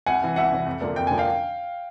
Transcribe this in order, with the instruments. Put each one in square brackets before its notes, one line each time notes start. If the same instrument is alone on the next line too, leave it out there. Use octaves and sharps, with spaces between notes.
[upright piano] C2 F#5 G#5
C3 E3
C2 E5 F#5
C3 E3
F2
D3 F3 A#3 D4
F2 G5
D3 F3 A#3 D4 G#5
F5 G5